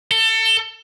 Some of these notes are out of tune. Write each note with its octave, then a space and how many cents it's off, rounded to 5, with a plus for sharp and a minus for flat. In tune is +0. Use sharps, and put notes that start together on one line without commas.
A4 +25